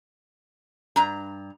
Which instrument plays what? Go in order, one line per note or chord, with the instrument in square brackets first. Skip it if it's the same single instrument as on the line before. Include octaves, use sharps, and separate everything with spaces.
[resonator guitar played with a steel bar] G2 A#5